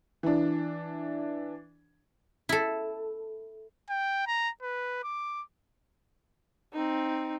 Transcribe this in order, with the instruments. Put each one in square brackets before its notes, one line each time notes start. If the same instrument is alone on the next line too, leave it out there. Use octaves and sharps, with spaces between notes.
[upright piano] E3 D4
[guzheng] E4 A4
[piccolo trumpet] G5
A#5
B4
D6
[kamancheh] C4 D#4